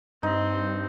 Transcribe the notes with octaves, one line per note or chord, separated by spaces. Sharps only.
G2 C4 D#4